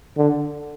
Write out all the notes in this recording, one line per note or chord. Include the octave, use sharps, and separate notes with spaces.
D3